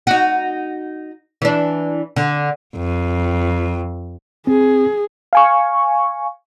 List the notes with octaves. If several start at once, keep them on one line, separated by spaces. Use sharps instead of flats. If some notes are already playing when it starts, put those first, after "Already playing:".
D#4 F#4
E3 D4
D3
F2
C4 G#4
F5 G#5 C#6